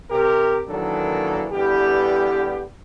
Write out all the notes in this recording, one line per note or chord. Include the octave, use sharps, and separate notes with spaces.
C3 G4 A#4
D#3 E3 F#3 A#3 D4 A4
D3 E3 G3 B3 G4